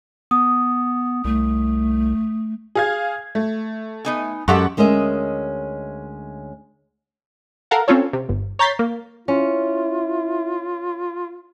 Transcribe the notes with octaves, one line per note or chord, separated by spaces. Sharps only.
B3 D#6
C2 A3
G#4 F5 G#6
A3
B3 D#4 G#5
F#2 G#3 G4 A4 F#5 C#6
D2 G#3 C#4 A#4 D#5 E5
A4 A#4 F5 F#5
C4 C#4 F4 A4 C#5
C3
G1
C#5 A#5 G6 A6 B6 C7
A#3
C#4 E4 F4